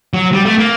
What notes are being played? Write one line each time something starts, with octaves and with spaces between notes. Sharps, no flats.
F#3
G3
A3
A#3